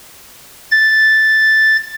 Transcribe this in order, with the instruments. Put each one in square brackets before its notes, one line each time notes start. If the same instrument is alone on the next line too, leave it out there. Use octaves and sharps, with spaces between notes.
[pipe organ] A6